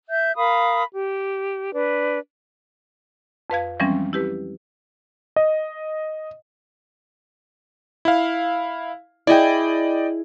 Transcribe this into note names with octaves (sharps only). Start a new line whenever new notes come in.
E5 G6
A#4 F5 B5 D#6
G4
D4 B4
F2 B4 F5 G#6
E3 F3 G3 G#3 C4 C#4
E4 G4 B4
D#5
E4 F5
E4 G#4 D5 D#5 G5